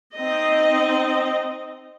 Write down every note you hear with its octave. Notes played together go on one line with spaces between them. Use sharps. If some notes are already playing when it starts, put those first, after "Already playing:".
C4 D#4 D#5